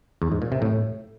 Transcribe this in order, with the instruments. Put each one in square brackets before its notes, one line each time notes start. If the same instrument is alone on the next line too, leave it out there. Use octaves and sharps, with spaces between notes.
[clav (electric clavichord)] E2
G#2
A#2
C3
A2